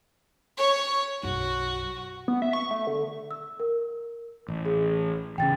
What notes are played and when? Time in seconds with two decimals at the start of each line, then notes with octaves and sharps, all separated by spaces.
0.57 C#5 C#6
1.23 B1 F#2 F#4
2.28 B3
2.42 E5
2.53 C#6
2.71 A3
2.87 D3
3.31 E6
3.60 A#4
4.48 A1
4.65 G#4
5.38 A1 C#3 G5 A6